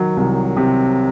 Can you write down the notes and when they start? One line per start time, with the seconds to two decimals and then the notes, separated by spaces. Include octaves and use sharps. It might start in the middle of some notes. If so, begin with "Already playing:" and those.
Already playing: D#3 F#3
0.17 C2
0.57 C3